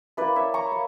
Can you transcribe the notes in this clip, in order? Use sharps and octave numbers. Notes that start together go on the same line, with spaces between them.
A#3 E4 B4 D5
C#5 E5
A#5 C#6
A#3